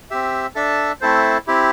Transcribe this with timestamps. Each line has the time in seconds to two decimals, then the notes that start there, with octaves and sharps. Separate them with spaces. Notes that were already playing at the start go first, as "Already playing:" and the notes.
0.11 C4 G4 E5
0.55 D4 A4 E5
1.01 A3 C4 E4 A4 C5
1.47 C4 E4 G4